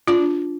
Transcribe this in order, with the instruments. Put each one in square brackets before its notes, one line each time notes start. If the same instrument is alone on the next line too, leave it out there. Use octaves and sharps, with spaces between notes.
[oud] D4 [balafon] F4